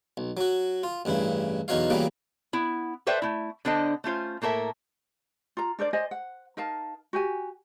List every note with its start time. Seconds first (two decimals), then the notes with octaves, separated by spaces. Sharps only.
0.17 B1
0.37 F#3 F#4
0.83 F4
1.05 A1 G2 C#3 E4
1.68 B1 E2 D#4 F#4 C#5 F5
1.90 C#3 E3 F#3 G3 A#3 B3
2.53 B3 E4
3.07 A4 B4 C5 D5 E5 G5
3.22 A3 E4
3.65 D3 B3 D4 A4 C5 D#5
4.04 A3 C#4 F4 C5
4.42 A2 A#3 A4 A#4 E5
5.57 F4 A#5
5.79 D4 A#4 C5 D5
5.93 C5 D5 D#5 G#5
6.11 F#5
6.57 D#4 A#4 F5 A5
7.13 F#4 G4 G#5